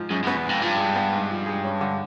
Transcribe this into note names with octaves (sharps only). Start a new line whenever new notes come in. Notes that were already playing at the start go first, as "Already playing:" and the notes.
Already playing: G#2 F3
F#2 G#3
F#2 B3
E2
F2 G#2
G2 F3
G#3
B3
G#2
F3
G#3
C#4
D3